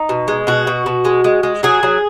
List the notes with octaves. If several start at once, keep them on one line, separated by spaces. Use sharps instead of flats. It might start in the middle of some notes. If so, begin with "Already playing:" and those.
Already playing: D#4
B2
G#3
B2 F#4
B2
B2
G#3
G#3
G#3
F#3 G#4
F#3